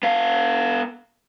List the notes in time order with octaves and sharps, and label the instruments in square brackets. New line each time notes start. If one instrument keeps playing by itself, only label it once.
[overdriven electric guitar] B3 F5